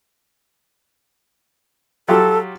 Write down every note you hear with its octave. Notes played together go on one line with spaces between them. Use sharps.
F#3 F4 G4 A4